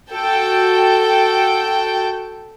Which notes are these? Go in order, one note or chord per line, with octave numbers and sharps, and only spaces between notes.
F#4 A4 G5